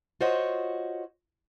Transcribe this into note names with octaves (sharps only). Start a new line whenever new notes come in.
F4 F#4 C5 C#5 D#5 F#5